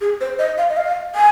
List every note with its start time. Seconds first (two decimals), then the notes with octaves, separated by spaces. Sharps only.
0.01 G#4
0.21 C5
0.39 D#5
0.58 F5
0.69 D#5
0.77 F5
1.15 G#5